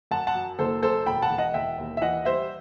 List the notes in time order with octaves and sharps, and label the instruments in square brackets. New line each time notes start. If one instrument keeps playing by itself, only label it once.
[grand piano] F#2 F#5 A5
F#5 A5
F#3
F#1 A4 C5
F#2 A4 C5
E1 G5 B5
F#5 A5
E1
D#5 F#5
E1 E5 G5
D#2
E5
E3 D#5 F#5
G3 C5 E5